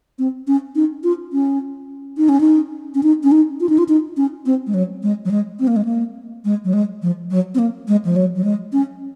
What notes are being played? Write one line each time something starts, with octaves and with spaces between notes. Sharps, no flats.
C4
C#4
D#4
F4
C#4
D#4
C#4
D#4
C#4
D#4
C#4
D#4
F4
D#4
F4
D#4
C#4
C4
G#3
F#3
G#3
F#3
G#3
C4
A#3
G#3
A#3
G#3
F#3
G#3
F3
F#3
C4
A#3
G#3
F3
F#3
F#3
G#3
C#4